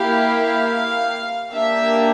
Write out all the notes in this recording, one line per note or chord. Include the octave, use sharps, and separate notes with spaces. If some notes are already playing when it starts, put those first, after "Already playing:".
Already playing: A#3 E4 G4 F5
F5
A#3 D4 G4 E5